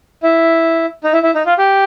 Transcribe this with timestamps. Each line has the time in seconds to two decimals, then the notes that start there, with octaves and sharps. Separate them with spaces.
0.23 E4
1.04 D#4
1.13 E4
1.23 E4
1.35 D#4
1.46 F4
1.58 G4